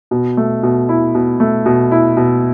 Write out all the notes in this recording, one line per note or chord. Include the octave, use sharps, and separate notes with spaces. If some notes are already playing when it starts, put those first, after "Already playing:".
B2
A3
B2
E4
B2
A3
B2
E4
B2